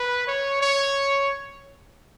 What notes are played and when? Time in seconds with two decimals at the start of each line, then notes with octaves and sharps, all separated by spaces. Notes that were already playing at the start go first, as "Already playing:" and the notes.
Already playing: B4
0.27 C#5
0.61 C#5